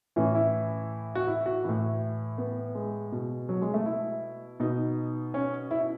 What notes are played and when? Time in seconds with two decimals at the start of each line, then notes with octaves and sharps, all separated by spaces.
0.16 A2 E3 C#4
0.35 E4
1.15 F#4
1.27 E4
1.46 F#4
1.64 A2 E3 E4
2.38 B3
2.75 G#3
3.12 B2
3.49 F#3
3.62 G#3
3.74 A3
3.86 E4
4.60 B2 D#4
5.34 C#4
5.71 E4